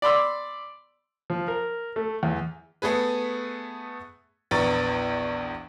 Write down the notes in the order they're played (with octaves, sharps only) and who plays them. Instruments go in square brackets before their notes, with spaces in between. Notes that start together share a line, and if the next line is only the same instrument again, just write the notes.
[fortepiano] D5 B5 C6 E6
F3
A#4
A3
E2
[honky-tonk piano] A3 B3 G#4 B4
A#1 E2 B3 A#5 C#6 A6